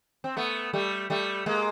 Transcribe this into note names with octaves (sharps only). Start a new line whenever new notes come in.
C4
A3 B3
G3 A3
G3 A3
G#3 A#3